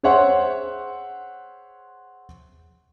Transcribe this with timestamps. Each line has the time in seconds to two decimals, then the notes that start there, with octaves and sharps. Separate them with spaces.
0.03 G#4 C5 C#5 E5 F#5 C6